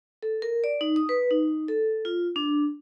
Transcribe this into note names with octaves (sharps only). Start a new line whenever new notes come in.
A4
A#4
D5
D#4
D#6
B4
D#4
A4
F4
D4